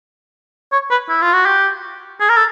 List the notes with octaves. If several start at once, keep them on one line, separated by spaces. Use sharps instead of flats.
C#5
B4
E4
F4
F#4
G4
G#4
A#4
A4